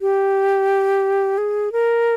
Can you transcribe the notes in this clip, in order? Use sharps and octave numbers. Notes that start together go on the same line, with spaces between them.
G4
G#4
A#4